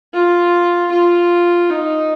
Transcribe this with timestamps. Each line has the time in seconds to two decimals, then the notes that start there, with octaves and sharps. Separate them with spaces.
0.14 F4
0.91 F4
1.70 D#4